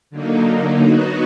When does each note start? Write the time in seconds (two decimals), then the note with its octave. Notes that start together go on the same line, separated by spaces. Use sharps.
0.10 D3 F#3 A#3 D#4
0.80 F#3 B3 D#4 F#4